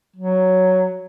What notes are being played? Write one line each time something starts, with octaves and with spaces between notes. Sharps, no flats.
F#3